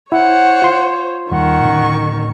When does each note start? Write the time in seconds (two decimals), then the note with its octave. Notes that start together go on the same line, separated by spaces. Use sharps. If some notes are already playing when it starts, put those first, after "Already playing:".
0.12 E4 C5 C#5 F#5
0.62 F4 C6
1.31 D#2 D#3 G3 F#5 C#6
1.64 A2 D3 C#4